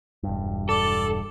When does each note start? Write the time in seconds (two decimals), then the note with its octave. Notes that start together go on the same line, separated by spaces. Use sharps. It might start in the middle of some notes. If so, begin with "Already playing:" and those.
0.23 E1 G2
0.69 A4 D5